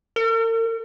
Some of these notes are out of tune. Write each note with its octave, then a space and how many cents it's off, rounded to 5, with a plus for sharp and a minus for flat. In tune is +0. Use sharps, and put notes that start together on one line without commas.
A#4 -45